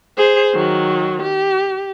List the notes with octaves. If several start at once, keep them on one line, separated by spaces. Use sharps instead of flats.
G#4 C5
D#3 F#3
G4